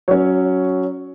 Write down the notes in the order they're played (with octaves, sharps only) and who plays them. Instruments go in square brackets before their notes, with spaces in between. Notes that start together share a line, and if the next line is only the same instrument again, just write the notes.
[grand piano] F#3 C#4 C#5